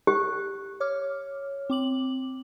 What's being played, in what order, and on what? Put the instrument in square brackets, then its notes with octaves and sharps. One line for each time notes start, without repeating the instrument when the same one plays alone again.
[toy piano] G4 [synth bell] F#6
[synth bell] C#5 D6 F6
C4 D6 F#7